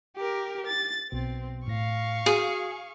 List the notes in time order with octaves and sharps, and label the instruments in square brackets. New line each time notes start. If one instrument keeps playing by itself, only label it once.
[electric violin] G4 A#4
A6
[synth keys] B1 B2 [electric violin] C4
[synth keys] A2 A#6 [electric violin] F5 C#6
[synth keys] F#4 [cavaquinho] G#4